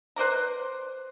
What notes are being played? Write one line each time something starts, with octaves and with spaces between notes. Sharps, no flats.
B4 C5 D5 A#5